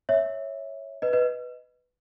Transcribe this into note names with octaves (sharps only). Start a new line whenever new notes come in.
C#5 E5
B4 D#5
B4 D#5